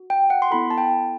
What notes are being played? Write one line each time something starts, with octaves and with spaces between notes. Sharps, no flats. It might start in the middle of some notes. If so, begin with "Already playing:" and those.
Already playing: F#4
G5
F#5
C6
B3 E4 A4 B5
A5
G5